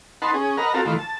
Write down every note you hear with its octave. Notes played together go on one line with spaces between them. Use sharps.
D#4 B4 F#5 A5 C6
C#4 G#4
A#4 B4 D#5 F#5 A#5
C4 F4 F#4 A4 A5 A#5
D#3 E3 A3 F4
A5